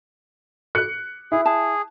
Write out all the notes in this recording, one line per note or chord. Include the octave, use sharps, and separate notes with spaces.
F#6 C#7
E4 G#4
G#4 A5